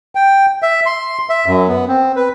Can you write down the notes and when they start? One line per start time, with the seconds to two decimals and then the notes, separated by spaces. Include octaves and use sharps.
0.15 G5
0.63 E5
0.86 C6
1.30 E5
1.46 F#2
1.68 B3
1.88 C4
2.16 B4